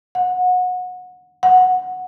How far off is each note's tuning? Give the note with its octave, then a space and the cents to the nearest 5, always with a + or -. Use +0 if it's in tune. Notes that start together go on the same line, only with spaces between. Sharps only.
F#5 -25
F#5 -5